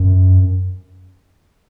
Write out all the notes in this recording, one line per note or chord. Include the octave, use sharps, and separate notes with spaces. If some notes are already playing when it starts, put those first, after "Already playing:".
Already playing: F#2